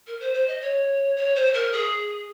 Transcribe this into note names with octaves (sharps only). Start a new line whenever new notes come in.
A#4
C5
C5
D#5
C#5
C#5
C5
A#4
G#4